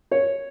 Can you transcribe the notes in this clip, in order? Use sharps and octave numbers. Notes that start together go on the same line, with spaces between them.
C#5